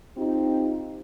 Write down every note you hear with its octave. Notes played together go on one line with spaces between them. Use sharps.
C4 D#4 F4 G4